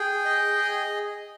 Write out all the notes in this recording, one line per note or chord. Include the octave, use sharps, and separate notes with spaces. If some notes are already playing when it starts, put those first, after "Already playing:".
Already playing: G#4 G5
D#5
G#4